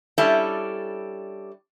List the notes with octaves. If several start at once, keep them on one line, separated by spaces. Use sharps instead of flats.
G3 C#4 D4 E4 A4